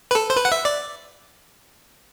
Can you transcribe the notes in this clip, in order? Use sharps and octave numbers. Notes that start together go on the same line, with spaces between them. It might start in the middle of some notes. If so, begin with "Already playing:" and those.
B4
A4
C5
B4
F#5
E5
D5